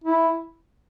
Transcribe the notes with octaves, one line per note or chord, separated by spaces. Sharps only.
E4